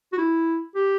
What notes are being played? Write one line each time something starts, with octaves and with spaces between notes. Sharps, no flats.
F#4
E4
G4